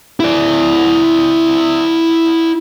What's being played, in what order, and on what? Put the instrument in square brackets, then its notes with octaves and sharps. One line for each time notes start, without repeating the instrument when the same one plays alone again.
[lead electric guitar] E4 D5